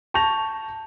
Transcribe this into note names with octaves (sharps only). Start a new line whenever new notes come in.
A5 C#6 G6 A#6 F7